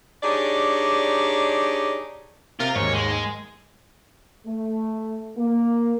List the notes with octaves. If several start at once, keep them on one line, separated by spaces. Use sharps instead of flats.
D4 D#4 G4 G#4 C#5 D5
C3 F4 A#4
D#2 G#2 C#5
G#3
A3
A#3